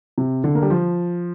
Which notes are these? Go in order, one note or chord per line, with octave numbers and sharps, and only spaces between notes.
C3
D3
A#3
G3
F3